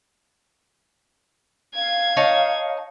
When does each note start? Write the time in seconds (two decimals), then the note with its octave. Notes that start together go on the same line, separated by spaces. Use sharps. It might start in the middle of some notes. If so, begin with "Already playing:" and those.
1.75 F5 G#6
2.17 D#4 C#5 A5